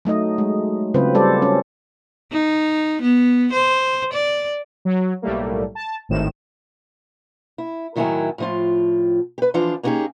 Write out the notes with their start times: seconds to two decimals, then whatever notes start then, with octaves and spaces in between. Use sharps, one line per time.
0.05 F#3 A3 D#4 D#5
0.38 G#3
0.94 C#3 F#3 C4 F4 B4 C5
1.15 G3 A4 C5 D5
1.42 C#4
2.32 D#4
3.02 B3
3.52 C5
4.13 D5
4.85 F#3
5.22 B1 A2 G3 A3 A#3
5.75 A5
6.09 G#1 A2 D#3 E7
7.58 E4
7.96 A2 D#3 F#3 E4 A#4 G#5
8.38 A2 F3 F4
9.38 G4 B4
9.54 E3 F3 D4 F4
9.83 A#3 B3 C#4 D#4 G4 G#4